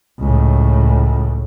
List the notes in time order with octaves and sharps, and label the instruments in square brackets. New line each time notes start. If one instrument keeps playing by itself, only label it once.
[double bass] C#2 A2